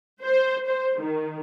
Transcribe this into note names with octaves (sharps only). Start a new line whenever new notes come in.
C5
C5
D#3